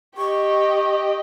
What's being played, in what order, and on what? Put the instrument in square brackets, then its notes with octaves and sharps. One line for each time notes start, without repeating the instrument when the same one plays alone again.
[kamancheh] G4 D#5 [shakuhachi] C#6